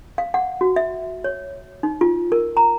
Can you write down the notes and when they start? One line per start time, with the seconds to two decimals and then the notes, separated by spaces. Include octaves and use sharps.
0.18 F5
0.34 F#5
0.61 F#4
0.76 E5
1.24 C#5
1.83 D#4
2.01 F4
2.32 A#4
2.57 A#5